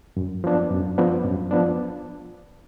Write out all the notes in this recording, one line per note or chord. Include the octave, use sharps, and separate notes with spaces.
F#2
F3 B3 D4
F#2
F3 B3 D4
F#2
F3 B3 D4